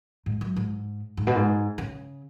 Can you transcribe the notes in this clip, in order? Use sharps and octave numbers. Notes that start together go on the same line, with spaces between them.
G#2
F#2
G#2
G#2
B2
G#2
C#3